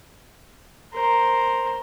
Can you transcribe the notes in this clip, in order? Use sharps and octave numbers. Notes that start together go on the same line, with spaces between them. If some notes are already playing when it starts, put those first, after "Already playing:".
A#4 C5